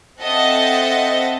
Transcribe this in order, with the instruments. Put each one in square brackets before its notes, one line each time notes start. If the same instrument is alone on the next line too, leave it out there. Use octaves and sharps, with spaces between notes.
[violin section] C4 A4 D#5 E5 F#5 A6